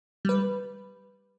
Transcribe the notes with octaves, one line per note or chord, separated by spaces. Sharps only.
G3 B4